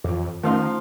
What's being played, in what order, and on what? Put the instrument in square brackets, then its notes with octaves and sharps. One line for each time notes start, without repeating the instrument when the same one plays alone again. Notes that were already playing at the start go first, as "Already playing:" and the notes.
[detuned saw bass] F2 [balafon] E3 F4
[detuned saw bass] D#3 [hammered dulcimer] F3 F5 C6 [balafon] A3 C#4